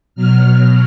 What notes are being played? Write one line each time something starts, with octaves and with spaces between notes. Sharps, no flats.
B2 F#3 F6